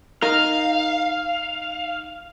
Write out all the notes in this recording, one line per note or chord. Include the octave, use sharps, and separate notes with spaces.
D#4 A#4 F5